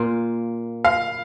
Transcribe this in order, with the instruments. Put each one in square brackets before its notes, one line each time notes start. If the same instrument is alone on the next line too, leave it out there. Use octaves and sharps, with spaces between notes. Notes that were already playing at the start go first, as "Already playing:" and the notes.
Already playing: [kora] A#2 A#3 F4
[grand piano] F5